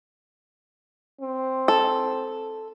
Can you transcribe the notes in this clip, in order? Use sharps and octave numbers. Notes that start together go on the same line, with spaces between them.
C4
A4